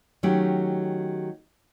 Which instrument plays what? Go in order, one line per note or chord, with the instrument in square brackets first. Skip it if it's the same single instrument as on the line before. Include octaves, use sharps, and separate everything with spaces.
[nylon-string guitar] D#3 F#3 A3 C#4 G4